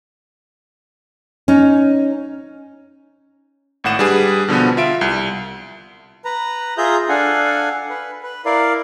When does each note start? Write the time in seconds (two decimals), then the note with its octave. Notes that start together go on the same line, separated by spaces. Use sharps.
1.48 C#4 D#4
3.84 G#1 A2 F#5 E7
3.99 G3 D4 G#4 B4
4.48 B2 D3 F3 B3
4.77 F4 E5 D7
5.01 C2
6.25 B4 A#5
6.78 F4 G#4 E5 A#5 G6
7.09 D4 A4 F5 F#5 G#5
7.90 B4
8.23 B4
8.45 E4 A#4 D5 F5